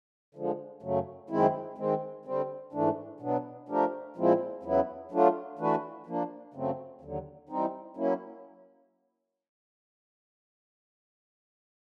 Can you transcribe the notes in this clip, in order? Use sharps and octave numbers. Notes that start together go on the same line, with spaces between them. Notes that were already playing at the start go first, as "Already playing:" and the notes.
D3 F3 G#3
F#2 C#3 F#3 A3
F#2 D#3 G#3 C4 E4
D#3 G#3 C4
D3 G3 C4
G#2 E3 A3 D4
B2 F#3 B3 D4
F3 A3 D4 G4 A#4
A#2 F3 G#3 C4 E4
E2 C#3 F#3 B3 E4
F#3 A3 D4 F4
E3 A3 D4 F#4 B4
F3 A#3 D4
F#2 C#3 F#3 A3 C4
D#2 D3 F#3
E3 G3 C4 D#4
F#3 A#3 C#4 E4